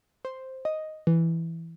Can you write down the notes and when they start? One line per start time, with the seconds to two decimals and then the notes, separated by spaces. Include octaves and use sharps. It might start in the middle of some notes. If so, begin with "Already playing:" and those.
0.25 C5
0.65 D#5
1.07 E3